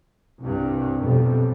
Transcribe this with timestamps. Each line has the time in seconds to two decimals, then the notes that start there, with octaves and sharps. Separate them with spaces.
0.41 C2 G2
1.02 B1 F2 C3 G3